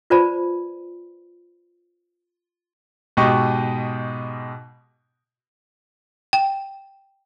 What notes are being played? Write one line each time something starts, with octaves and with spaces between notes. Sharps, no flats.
F4 B4 C5 D5 A5 B5
G#2 B2 G4 D#5 C#6
G5